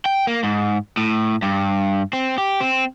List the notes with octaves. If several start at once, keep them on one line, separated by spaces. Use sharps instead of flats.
G5
A#3
G#2
A2
G2
C4
G4
C4